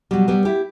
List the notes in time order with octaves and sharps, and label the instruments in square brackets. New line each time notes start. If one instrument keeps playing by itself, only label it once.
[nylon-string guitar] B2 F#3 G3
G3 B3
E4 G4